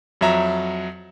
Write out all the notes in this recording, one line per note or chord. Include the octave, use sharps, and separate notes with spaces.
F2 F#3 E5 A#5